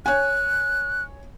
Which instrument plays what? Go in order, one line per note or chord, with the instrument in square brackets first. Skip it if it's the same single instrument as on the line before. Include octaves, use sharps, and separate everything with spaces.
[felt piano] C#5 G#5 [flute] F#6